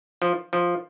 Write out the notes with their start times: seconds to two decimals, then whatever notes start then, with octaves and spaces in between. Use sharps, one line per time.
0.22 F3
0.53 F3